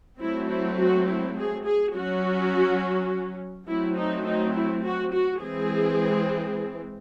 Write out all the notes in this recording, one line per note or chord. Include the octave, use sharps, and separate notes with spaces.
F#3 A3 C4 E4
E4
F#4
E4
G#4
G#4
F#3 C#4 F#4
F#3 A3 C4 E4
D#4
D#4
E4
F#4
F#4
E3 G#3 C4 G#4